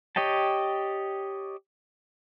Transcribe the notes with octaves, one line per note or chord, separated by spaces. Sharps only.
G4 C#5 D#5 G5 A5